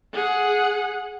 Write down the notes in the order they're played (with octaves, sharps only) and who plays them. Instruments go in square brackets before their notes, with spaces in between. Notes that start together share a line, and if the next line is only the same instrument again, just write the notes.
[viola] G#4 F#5